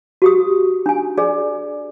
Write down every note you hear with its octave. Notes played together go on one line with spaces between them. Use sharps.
F#4 G4 D#6
D4 G#5
G#4 D5